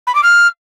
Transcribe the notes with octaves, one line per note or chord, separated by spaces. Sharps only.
B5
D6
F6